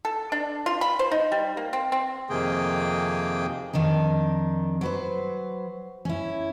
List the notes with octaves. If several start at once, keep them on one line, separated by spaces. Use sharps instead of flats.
A4
D4
F4
B5
C5
D#4
G3
A#3
C4
C4
F2 C3 D#3 A#3 G#4 G5
F2 D#3 D4 D#4
F#3 B4 C5
C#4 E4